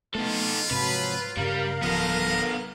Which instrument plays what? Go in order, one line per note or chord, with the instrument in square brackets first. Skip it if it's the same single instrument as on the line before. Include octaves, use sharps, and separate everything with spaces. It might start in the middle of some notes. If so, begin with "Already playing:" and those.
[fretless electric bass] A3 B3 [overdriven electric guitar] D#4 A4 [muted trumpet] F4
[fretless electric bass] G#2 C3 [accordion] F3 F#3 [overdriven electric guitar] B4
[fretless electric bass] G2 C#3 [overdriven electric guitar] G3 [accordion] A#4 F5
[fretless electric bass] D1 F3 [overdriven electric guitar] B3 A4 [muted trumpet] D#5